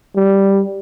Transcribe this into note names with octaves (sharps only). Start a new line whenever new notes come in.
G3